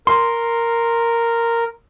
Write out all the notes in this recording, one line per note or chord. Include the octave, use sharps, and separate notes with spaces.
A#4 C6